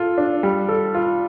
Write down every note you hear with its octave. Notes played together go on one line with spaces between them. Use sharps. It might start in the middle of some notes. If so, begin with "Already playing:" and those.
Already playing: F4 A4
D4
G3
A4
F4